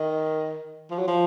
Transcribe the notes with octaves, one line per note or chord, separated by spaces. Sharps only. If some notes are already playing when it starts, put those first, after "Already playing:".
Already playing: D#3
F3
F#3
F3